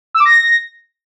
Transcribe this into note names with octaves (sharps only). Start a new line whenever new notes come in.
E6
D6
A#6